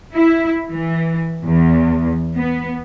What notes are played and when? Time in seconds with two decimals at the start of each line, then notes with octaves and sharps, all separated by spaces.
0.14 E4
0.70 E3
1.44 E2
2.37 B3